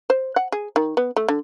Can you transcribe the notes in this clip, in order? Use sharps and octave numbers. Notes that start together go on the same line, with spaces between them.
C5
F#5
G#4
D#3
B3
A3
D3